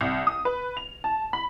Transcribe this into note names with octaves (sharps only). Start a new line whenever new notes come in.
C2
D#6
B4
F7
A5
B5